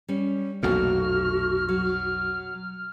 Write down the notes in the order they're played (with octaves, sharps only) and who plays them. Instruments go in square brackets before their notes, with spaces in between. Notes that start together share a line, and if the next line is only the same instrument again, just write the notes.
[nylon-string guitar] G3 C#4
[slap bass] B1 F2 A#2 [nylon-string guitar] A3 A#3 [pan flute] F#4 [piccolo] F6
[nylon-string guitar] F#3